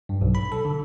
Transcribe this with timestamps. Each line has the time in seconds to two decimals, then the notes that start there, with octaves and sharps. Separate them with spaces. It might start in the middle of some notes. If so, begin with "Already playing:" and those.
0.09 G2
0.21 B1
0.35 B5
0.52 A4
0.65 D3